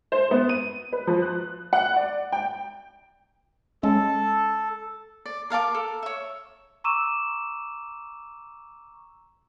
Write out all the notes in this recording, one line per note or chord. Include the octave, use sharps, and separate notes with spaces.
C5
B3
D#7
B4
F3
F#6
F#5
D5
G5
G#3 C#4 A4
D5
A#4 F5 A5 D6
A4
C#5 E5
A#5 C#6 D6 E6 D#7 E7